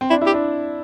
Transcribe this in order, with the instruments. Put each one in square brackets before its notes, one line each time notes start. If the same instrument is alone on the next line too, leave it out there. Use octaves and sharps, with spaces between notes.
[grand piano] C4
[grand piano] D4 [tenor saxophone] E4
[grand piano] E4
[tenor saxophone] G4
[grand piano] D4